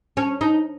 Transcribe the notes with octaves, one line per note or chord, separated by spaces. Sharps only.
C#4
D#4